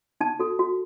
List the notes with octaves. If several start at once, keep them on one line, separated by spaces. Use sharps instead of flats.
D#4 A5
F#4 A4
F#4